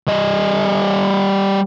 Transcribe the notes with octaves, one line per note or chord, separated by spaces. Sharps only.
G3 D#5